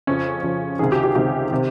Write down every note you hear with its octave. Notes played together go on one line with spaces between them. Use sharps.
F2 C#3 F3 C#4
F2 C#3 F3
C#2 C3 D#3 G#4
G4
G4
C#2 C3 D#3 G4
C3 D#3